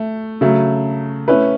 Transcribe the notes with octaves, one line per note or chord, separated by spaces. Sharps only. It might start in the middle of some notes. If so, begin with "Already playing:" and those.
Already playing: A3
C#3 F#3 A3
A3 C#4 E4 B4